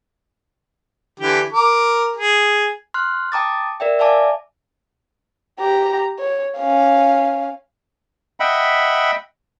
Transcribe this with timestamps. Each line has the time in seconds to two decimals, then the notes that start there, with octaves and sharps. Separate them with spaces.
1.20 D3 E3 G4
1.53 A#4 D6
2.16 G#4
2.94 C6 F6 F#6
3.32 G5 A5 A#5 D6 D#6 A6
3.80 A#4 D5 E5 G5
3.99 D5 E5 F5 G#5 A5 D6
5.60 G4 A#5
6.19 C#5
6.58 C#4 F5
8.40 D#5 E5 F#5 G5 B5